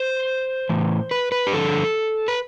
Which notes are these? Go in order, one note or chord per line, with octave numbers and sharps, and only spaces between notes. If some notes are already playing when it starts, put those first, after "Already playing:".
Already playing: C5
A2 E3
B4
B4
G4
G2 D3 F3 A4
B4